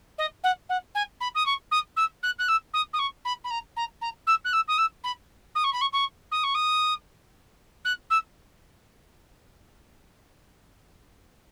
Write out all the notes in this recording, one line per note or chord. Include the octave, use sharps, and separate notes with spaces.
D#5
F#5
F#5
G#5
B5
D#6
C#6
D#6
E6
F#6
F#6
E6
D#6
D#6
C#6
B5
B5
A#5
A#5
A#5
E6
F#6
E6
D#6
E6
B5
D#6
C#6
B5
C#6
C#6
D#6
C#6
D#6
F#6
E6